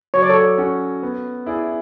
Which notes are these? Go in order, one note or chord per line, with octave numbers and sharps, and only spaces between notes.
F#3 C#5
D5
A4 C#5
C#4 F#4
B3
E4 G#4 D5